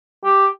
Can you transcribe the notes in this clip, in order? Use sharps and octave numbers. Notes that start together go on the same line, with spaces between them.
G4